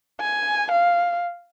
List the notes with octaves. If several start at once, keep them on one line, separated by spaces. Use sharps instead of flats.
G#5
F5